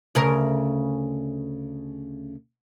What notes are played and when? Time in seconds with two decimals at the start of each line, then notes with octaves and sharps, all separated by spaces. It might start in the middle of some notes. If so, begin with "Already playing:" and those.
0.15 D2 C#3 A#4